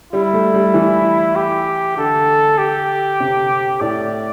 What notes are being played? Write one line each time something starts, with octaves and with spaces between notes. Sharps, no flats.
G3 E4
A3
G3
E3
G4
D3 A4
G4
C3
A2 D5